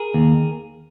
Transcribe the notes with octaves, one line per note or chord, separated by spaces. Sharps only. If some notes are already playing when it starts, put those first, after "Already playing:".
Already playing: G#4 A#4
D#2